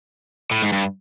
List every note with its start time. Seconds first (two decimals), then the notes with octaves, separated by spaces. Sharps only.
0.51 A2
0.62 G#2
0.73 G2